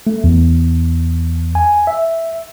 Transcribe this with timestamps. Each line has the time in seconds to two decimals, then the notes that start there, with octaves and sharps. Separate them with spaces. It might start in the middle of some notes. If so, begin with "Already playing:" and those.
0.07 A3
0.24 E2
1.55 G#5
1.87 E5